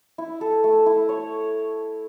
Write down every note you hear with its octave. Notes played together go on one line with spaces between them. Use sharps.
E4
A4
A3
E4
C#5